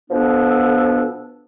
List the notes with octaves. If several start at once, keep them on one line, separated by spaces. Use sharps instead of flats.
B2 F3 B3 D4 A4